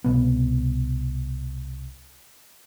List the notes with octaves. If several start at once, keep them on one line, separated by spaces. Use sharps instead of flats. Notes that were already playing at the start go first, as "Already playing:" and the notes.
C2 B2 B3